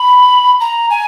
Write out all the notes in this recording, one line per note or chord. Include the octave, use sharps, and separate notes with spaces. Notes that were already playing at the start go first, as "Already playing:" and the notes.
Already playing: B5
A#5
G#5